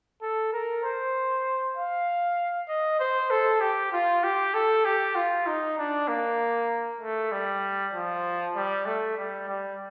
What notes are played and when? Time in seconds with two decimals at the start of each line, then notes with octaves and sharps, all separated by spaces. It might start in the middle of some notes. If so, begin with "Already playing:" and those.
0.22 A4
0.53 A#4
0.84 C5
1.77 F5
2.69 D#5
3.00 C5
3.30 A4
3.61 G4
3.93 F4
4.24 G4
4.54 A4
4.85 G4
5.16 F4
5.46 D#4
5.78 D4
6.08 A#3
7.01 A3
7.32 G3
7.93 F3
8.55 G3
8.86 A3
9.18 G3
9.48 G3